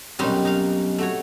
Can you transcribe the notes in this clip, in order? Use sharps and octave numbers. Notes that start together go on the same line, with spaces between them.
B1 F#2 G3 C4 C#4 D#4
D#4 F5
A3 F#4 C#5